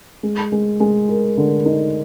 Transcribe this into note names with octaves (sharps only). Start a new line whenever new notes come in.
G#3
G#3
G#3
A#4
D3
D#4